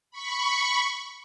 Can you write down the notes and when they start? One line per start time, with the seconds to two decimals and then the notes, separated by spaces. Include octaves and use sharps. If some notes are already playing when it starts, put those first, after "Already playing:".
0.11 B5 C#6